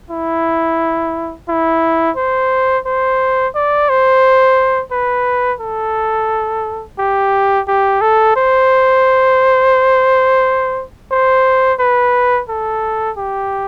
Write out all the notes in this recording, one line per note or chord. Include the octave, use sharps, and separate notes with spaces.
E4
E4
C5
C5
D5
C5
B4
A4
G4
G4
A4
C5
C5
B4
A4
G4